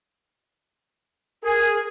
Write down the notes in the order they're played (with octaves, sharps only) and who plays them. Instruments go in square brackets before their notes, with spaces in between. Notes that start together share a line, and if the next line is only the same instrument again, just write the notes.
[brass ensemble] G#4 [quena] A#4